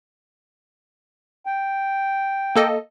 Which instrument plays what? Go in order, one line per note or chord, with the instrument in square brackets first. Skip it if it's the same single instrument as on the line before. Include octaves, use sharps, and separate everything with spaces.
[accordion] G5
[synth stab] A#3 A4 D#5